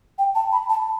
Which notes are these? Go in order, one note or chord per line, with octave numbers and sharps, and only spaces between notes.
G5
A5
B5
A5